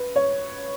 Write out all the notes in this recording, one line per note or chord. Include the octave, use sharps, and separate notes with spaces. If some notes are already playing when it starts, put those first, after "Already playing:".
Already playing: B4
C#5